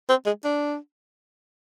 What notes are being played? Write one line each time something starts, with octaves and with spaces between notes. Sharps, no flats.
C4
G#3
D4